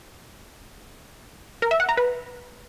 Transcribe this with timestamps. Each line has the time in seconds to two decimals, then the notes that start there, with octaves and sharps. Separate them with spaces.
1.62 A#4
1.71 E5
1.80 F#5
1.89 A#5
1.97 B4